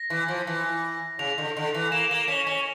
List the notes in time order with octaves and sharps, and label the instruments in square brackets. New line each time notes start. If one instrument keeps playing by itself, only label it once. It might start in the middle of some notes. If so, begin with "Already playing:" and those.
Already playing: [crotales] A#6
[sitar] E3
F3
E3
[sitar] C#3 [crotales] F7
[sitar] D3
D3
E3
[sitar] A#3 [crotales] E7
[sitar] A#3
C#4
C#4